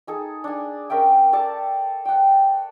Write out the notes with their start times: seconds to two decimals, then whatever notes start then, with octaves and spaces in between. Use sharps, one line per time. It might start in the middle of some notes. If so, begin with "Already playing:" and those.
0.07 D#4 G#4 A4
0.44 D4 G#5
0.90 C#4 A#4 E5 G5
1.33 A4 D5 A5
2.05 F#5 G5